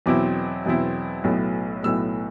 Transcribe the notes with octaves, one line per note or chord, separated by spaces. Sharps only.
E2 B2 F#3 C4 E4 D6
E2 B2 F#3 C4 E4
B1 A2 F#3 B3
B1 A2 F#3 B3 E6